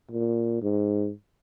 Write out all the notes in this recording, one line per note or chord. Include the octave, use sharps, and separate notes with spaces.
A#2
G#2